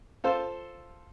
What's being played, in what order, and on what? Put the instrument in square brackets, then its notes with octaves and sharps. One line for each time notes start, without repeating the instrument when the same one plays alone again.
[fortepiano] F4 A4 C5